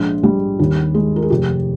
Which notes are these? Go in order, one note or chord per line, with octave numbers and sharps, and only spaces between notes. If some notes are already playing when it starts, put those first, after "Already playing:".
Already playing: A#1 G#3
G3
D#2
G#3
A#4
G#4
F1 G4